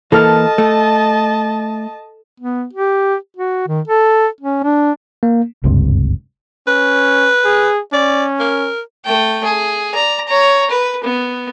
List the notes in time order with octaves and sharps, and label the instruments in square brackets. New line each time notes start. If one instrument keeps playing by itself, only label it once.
[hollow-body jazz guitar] E3 A#3 [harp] A4 F6 [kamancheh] D#5 A5
[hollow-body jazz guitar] A3
[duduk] B3
G4
F#4
D#3
A4
C#4
D4
[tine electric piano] A#3
[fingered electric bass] F#1 C#2 G2 C3
[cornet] C#4 [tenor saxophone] B4
[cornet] G#4
[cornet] C#4 [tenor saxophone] D5
[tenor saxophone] A#4
[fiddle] A3 G5
G#4
D5 A#5
C#5 A#5
B4
B3